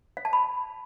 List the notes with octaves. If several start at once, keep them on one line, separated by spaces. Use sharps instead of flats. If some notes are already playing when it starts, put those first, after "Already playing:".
F5
A5
B5